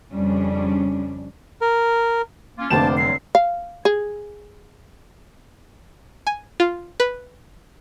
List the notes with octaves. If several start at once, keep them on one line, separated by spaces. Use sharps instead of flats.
F2 C#3 G3 C#4 D4
A#4
A#3 C#4 F4
F1 D3 A3 A#3 C5 D5 A5 E7
F#3 G3 C4 C7
F5
G#4
G#5
F4
B4